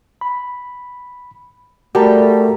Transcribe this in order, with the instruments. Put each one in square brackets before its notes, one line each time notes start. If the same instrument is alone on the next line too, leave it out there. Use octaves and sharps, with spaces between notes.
[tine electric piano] B5
[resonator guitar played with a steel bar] G3 [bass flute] A3 [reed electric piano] F#4 A#4 [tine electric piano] G4 A5 A#5